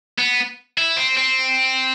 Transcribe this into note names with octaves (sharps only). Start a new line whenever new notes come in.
B3
E4
C4
C4